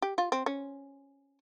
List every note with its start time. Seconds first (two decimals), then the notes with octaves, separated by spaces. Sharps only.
0.02 G4
0.18 F4
0.32 C4
0.46 C#4